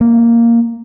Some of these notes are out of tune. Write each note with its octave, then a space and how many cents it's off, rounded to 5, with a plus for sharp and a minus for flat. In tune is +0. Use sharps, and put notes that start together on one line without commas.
A#3 -5